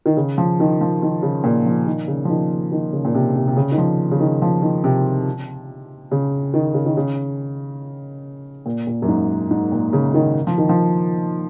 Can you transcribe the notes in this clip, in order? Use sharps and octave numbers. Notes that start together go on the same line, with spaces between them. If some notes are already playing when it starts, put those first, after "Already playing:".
D#3
C#3
F3
D#3
F3
D#3
C#3
A#2
F3
D#3
C#3
F3
D#3
D#3
C#3
A#2
C3
C3
C3
C#3
D#3
F3
C#3
D#3
F3
D#3
C3
C#3
D#3
C#3
D#3
C#3
A#2
A#2
F#2
G#2
G#2
A#2
C#3
D#3
F3
D#3
F3